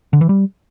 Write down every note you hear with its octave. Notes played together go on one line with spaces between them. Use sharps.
D3
E3
G3